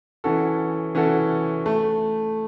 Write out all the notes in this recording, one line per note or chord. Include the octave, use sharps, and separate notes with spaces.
E3 C#4 F#4 A4
E3 C#4 F#4 A4
A3